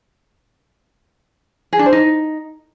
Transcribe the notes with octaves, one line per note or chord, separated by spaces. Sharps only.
G#4
D4
C5
D#4